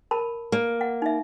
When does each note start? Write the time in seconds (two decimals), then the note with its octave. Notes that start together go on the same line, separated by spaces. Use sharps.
0.11 A#4 A5 B5
0.52 A#3
0.81 F#5
1.02 D#4 E5